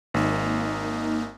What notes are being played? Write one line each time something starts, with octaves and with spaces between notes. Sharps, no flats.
G#1 A#3 D#4